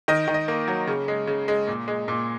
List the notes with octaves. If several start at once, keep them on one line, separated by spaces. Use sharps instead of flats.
D#3 D#5
D#3
D#5
A#3
F#3
C#3
G#3
C#3
G#3
A#2
G#3
A#2